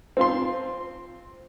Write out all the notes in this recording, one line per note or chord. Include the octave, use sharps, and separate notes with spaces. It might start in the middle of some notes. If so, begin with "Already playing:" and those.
C4 F4 C6